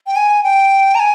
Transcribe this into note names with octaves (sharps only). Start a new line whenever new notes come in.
G5
G#5
G5
A#5
G#5